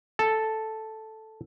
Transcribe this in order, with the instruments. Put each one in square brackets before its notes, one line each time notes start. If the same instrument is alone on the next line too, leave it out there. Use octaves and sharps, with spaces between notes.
[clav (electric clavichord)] A4